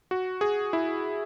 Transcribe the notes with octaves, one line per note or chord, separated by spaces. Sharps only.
F#4
G#4
E4